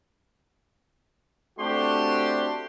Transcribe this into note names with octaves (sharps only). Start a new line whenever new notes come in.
A3 C4 D4 F#4 G4 C6